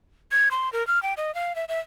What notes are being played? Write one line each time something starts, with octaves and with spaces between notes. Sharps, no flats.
G#6
C6
A#4
F6
G5
D#5
F5
E5
E5